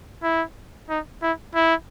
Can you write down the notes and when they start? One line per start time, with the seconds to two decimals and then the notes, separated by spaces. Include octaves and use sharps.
0.23 E4
0.89 D#4
1.22 E4
1.55 E4